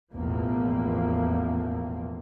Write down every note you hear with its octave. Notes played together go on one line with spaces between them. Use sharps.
A1 E2 B2 F3 A#3